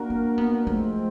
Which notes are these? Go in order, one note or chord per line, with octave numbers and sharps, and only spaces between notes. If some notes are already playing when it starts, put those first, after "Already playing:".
Already playing: A#3 D4 F#4 A#4
C4
B3
F3 G#3 A3 C4